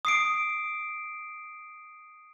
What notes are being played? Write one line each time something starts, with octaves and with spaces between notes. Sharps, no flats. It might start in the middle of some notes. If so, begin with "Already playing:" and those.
D#6 C7 D7